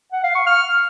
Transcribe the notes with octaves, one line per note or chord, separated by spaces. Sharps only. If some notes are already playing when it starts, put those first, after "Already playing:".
F#5
F5
C#6
F6